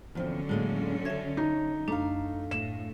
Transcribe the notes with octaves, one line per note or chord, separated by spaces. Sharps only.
E2 D3 F3 F#3 C4 C#4
A2 G#3 A#3
A4 C#5 E5 G#6
D#4
F#2 A3 D4 F5
A2 E7